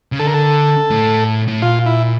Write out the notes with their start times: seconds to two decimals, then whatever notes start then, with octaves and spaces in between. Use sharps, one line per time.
0.12 C#3
0.19 D3 A4
0.27 A#4
0.34 A4
0.90 A2
1.48 A2
1.62 A#2 F4
1.86 E4